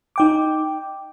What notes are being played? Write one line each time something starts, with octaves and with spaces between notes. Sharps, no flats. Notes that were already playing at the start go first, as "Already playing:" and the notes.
D#4 G5 D6